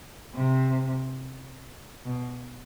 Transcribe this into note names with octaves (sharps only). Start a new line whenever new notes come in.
C3
B2